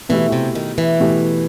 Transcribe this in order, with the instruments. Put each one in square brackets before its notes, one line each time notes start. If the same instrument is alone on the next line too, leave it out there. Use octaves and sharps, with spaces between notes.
[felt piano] B2 A3 E4 G4 [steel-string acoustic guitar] E3
[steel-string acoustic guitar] C3
D#3
E3
[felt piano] B2 A3 E4 G4